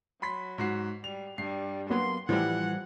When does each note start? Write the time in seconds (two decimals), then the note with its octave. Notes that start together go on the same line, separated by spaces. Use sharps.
0.22 F#3 B5 C6 B6
0.58 G#2 F#4 C7
1.04 G3 F7
1.38 G2 G3 C7
1.90 F#3 A#3 B3 C6
2.29 A2 E3 F3 G3 F#5